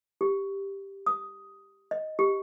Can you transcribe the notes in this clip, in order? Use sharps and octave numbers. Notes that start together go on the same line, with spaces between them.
G4
D#6
D#5
G4